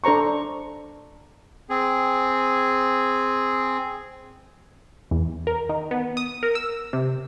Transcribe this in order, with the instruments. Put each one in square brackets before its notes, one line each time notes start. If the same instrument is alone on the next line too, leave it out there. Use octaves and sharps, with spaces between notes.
[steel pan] D4 A4 C5 A#5 C#6
[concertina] C4 G#4
[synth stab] E2
A#4
D#3
B3
D#6
A#4
E6
C3